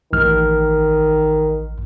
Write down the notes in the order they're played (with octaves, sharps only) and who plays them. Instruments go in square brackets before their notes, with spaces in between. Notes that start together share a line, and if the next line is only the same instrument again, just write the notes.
[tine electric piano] A1 F6 [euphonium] D#3